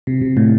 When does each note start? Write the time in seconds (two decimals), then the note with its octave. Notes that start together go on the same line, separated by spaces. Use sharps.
0.07 C3
0.22 C3
0.37 A2